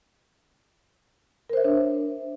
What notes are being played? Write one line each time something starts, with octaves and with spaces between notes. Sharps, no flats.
D4 A#4 C5 C#5 E5